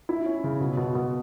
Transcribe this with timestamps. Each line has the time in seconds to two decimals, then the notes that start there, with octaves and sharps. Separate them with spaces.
0.09 E4
0.26 C#4
0.44 C#3
0.60 B2
0.77 B2
0.95 B2